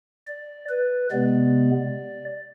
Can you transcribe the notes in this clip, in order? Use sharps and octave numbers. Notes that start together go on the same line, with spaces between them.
D5
B4
C3 G#3 B3 D5